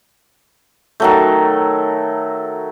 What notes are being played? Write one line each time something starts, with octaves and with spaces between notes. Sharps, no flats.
D#3 F#3 A3